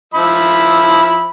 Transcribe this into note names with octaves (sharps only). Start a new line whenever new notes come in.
F3 E5 B5